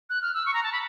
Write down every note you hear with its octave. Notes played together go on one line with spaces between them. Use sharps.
F#6
F6
E6
C#6
A#5
A5
B5